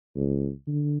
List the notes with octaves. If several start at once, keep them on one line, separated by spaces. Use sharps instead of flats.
C#2
D3